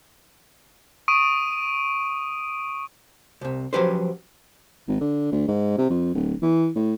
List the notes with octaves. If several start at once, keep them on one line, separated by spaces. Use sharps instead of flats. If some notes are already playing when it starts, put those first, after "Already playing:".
C#6 D#6 D7 D#7
C2 C3
F3 F#3 C#4 G4 B4 C5
G#1
D3
D2
G#2
C3
F2
D1
E3
A2